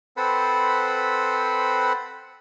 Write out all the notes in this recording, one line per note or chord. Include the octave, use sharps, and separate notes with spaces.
C4 A4 B4 C5 F#5 B5